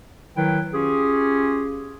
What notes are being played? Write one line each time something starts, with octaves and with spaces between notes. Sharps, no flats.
D#3 F#3 E4 B4 G5
C#4 F4 G4 G#4